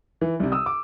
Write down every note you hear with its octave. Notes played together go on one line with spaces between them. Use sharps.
E3
C2 C3
D#6 E6
D6